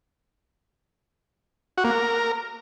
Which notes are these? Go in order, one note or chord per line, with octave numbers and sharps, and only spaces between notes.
F#4
A#3
A#4